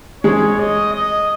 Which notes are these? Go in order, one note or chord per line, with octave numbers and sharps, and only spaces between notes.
G#3 C#5
D#5
D#5